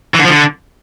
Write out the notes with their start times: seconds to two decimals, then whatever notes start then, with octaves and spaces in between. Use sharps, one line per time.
0.14 E3
0.19 D3
0.24 F3
0.29 D3